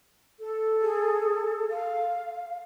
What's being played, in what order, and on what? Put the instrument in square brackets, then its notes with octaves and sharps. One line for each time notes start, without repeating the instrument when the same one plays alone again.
[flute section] A4
[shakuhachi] G#4
F5